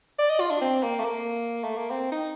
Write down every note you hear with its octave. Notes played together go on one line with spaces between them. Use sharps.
D5
D#5
F4
D4
C4
A#3
A3
A#3
A3
A#3
C4
D#4